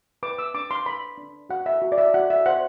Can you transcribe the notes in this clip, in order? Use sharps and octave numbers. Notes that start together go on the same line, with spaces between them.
B4 D6
E6
D4 D6
C6
B4 B5
D4
F#4 F#5
E5
F#4
D5
E5
F#4 F#5
E5
C5 F#5